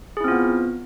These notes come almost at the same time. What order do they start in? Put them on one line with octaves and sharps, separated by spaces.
G#4 E4 C4 F4 B3